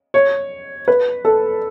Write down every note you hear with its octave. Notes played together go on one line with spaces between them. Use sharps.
C#5
B4
A4